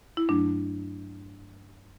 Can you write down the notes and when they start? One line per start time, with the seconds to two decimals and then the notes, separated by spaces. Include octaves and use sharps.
0.17 E4
0.29 G2 F#3 A3 D4